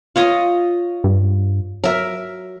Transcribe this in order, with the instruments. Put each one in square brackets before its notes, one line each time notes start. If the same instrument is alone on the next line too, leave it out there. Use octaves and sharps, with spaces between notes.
[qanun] F4 C#5 D#5
[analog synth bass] G2
[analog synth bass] F#3 [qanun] A#4 E5